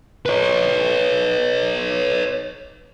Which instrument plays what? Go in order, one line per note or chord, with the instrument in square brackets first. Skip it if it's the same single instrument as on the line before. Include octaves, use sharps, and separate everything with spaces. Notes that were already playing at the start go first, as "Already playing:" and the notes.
[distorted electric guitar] B4 C#5